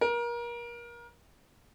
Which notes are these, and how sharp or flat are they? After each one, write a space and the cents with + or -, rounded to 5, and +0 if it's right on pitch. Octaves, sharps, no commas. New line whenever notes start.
A#4 +30